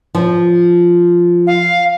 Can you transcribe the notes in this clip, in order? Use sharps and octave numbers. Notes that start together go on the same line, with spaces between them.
F3
F5